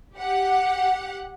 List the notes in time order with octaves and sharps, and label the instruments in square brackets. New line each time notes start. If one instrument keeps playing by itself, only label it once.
[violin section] G4 F#5